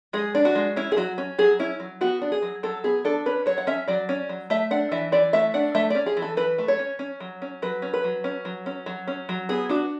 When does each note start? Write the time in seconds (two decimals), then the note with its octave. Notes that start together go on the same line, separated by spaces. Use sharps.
0.13 G#3 G#4
0.35 D4
0.45 F#4
0.55 G#3
0.76 C#4 E4
0.92 G#4
0.97 F#3 F#4
1.18 C#4
1.39 F#3 G#4
1.59 C#4 E4
1.80 F#3
2.01 B3 F#4
2.22 D4
2.32 G#4
2.42 F#3
2.63 F#3 A4
2.84 B3 G#4
3.05 D4 A4
3.26 C#4 B4
3.46 F#3 C#5
3.58 F#5
3.67 C#4 E5
3.88 F#3 D5
4.09 C#4
4.29 F#3
4.50 A3 E5
4.71 D4 F#5
4.92 E3 E5
5.12 E3 D5
5.33 A3 E5
5.54 D4 F#5
5.75 A3 E5
5.90 C#4 D5
6.06 G#4
6.17 E3
6.22 A4
6.37 E3 B4
6.58 A3
6.68 C#5
6.79 C#4
6.99 C#4
7.20 F#3
7.42 C#4
7.62 F#3 B4
7.82 C#4
7.94 B4
8.04 F#3
8.24 C#4
8.45 F#3
8.66 C#4
8.86 F#3
9.08 C#4
9.29 F#3
9.49 B3 G#4
9.69 D4 F#4